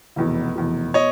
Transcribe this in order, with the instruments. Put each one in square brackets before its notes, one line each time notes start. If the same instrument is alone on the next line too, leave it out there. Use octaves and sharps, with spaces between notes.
[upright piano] F1 E2 B2
F1 E2 B2
[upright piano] B2 [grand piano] C#5 D#5